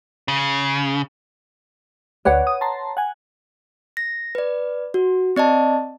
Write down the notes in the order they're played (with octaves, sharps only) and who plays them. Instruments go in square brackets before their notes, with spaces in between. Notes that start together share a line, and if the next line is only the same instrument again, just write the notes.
[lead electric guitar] C#3
[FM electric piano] D2 D5 [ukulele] B4 C#5 F#5
[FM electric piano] D#6
A5 A#5 C6
F#5 G#5
[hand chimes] A#6
B4 D5
F#4
C4 D5 D#5 A5